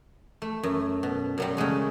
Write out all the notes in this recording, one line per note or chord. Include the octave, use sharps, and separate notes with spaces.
A3
F#2
B2
F#2 F#3 G3
C#3 F#3 G#3 A3